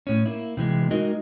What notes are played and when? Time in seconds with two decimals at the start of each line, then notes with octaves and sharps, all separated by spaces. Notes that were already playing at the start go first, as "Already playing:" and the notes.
0.07 A2 C#4
0.26 A#3 E4
0.57 C3 E3 G#3
0.91 G#3 D#4 F#4 A#4 D#5